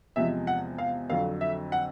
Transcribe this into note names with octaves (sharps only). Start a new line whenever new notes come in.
E2 C3 F3 G#3 E5
F#5
F5
F2 D3 F#3 F5
E5
F#5